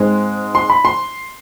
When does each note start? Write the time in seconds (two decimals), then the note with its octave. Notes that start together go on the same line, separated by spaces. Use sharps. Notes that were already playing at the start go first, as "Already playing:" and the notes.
Already playing: G#2 G#3 C4
0.55 C6
0.70 B5
0.85 C6